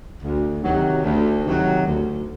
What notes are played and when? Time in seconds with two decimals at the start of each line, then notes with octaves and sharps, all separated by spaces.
0.23 D2
0.63 C3 D#3 F#3
1.04 D2
1.45 C3 D#3 F#3
1.86 D2